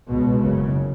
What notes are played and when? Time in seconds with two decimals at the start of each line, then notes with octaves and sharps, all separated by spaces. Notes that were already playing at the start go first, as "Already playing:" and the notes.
0.10 C#2 B2
0.43 F#1 F#2 C#3